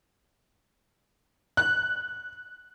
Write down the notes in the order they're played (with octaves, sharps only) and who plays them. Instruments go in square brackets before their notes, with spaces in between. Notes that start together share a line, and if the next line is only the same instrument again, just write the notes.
[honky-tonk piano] F#6